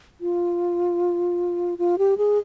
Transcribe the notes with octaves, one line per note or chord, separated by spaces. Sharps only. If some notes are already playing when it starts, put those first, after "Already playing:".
F4
F4
G4
G#4